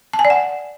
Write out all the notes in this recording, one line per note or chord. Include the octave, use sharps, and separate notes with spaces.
A5
G#5
D5
F#5